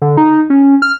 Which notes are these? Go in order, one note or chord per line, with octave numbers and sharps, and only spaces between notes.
D3
D#4
C#4
F6